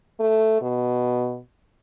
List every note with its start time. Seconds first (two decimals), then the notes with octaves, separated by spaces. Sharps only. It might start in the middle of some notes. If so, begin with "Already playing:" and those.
0.20 A3
0.61 B2